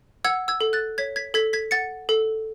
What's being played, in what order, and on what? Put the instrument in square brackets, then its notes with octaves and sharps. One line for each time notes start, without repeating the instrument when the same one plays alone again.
[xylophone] F#5 E6 G#6
E6 G#6
A4
F#6 A6
C#5 G#6 B6
G#6 B6
A4 G#6 B6
G#6 B6
F#5 A6 C#7
A4